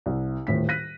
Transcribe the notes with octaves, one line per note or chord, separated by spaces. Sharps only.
C2
D#1 A2 B6
F#6 A#6 B6 D#7